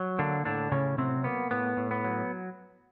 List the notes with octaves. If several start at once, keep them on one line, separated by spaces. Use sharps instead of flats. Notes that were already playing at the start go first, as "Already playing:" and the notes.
Already playing: F#3
D3 A#3 D4
A2 D3 D4
A2 C#3 C#4
C3 F#3 C4
A#3 B3
A2 B3
A2
B3
F#3